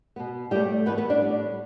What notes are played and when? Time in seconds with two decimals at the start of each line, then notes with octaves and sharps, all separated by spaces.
0.16 B2 B3
0.51 A2 G3 A3 G4
0.86 A2 E3 A3 B3 B4
0.98 B3 B4
1.10 D4 D5
1.21 A2 G3 B3